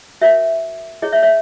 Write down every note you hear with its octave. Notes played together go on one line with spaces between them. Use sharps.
F#4 A#4 C#5 E5
E4 G#4 C#5 D#5
C#5 E5
C#5 E5